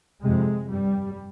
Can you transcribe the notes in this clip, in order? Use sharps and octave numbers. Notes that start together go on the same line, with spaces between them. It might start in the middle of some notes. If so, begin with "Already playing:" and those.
F2 C3 G#3
G2 G3